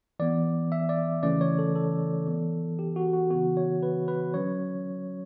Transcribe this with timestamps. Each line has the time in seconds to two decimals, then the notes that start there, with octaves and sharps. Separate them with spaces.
0.19 E3 B3 D5
0.72 E5
0.89 D5
1.23 C#3 E3 A3 C#4 D5
1.41 C#5
1.58 A4
1.76 A4
2.26 E3 B3
2.79 G4
2.96 F#4
3.13 F#4
3.30 C#3 E3 B3 F#4
3.57 C#5
3.83 B4
4.08 B4
4.34 D3 F#3 C#4 C#5